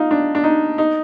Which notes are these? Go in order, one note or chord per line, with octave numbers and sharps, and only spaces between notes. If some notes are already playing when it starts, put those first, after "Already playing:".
Already playing: D#4 F4
D4
D4
D#4
D#4